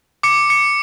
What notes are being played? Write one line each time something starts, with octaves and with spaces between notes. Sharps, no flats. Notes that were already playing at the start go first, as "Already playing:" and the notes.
D6 C#7
C#7